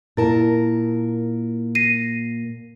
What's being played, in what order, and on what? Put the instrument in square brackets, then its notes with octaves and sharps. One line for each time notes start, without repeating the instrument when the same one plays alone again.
[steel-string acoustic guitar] A#2 A#4 A5 [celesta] E4
[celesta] A#6 C7 D#7